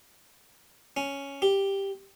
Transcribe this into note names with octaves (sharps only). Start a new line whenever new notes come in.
C#4
G4